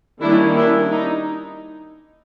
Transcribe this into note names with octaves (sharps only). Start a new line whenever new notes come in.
D#3 G3 A#3 C#4 D4 E4
D4 E4
D#4